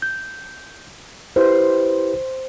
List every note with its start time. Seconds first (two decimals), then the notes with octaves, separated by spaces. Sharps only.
0.02 G6
1.36 E4 G4 B4 C5